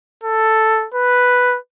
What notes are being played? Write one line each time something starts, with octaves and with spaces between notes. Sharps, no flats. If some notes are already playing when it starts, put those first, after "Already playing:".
A4
B4